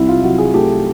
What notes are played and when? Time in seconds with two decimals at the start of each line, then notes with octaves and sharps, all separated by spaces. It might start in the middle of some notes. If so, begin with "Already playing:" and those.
Already playing: C2 C3 E4
0.08 F4
0.24 F#3 F#4
0.38 G#4
0.54 A3 G4